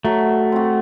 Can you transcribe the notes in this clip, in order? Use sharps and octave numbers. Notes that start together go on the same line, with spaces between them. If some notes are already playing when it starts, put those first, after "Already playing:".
F#3 A3
C4 F#4